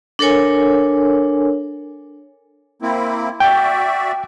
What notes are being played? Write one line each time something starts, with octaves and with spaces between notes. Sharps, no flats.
D4 A4 A#4 C#5 G#5
A#3 C4 E4
F#4 D5 E5 G5